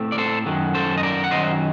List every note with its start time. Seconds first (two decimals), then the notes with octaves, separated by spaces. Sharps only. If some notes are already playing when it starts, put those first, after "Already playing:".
Already playing: A2 A3 C4
0.12 D5
0.18 A4 C5
0.46 F#2 D#3 F#3
0.75 A4 C5
0.98 D#5
1.03 A#4 D5
1.24 F#5
1.31 F#2 D#3 F#3 C5 D#5